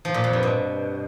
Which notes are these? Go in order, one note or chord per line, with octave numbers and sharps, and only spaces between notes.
F3
A#2
F2
G2
B2